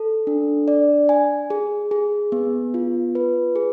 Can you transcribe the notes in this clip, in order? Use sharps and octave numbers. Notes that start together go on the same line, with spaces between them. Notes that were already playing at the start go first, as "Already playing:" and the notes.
Already playing: A4
D4
D5
G#5
G#4
G#4
B3
F4
B4
G#4